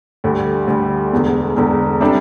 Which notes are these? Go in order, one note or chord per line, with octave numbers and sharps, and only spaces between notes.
D2 D3 G3
D2 D3 G3
E1 E2 D3
E1 E2 D3
C3 G3 D4 A4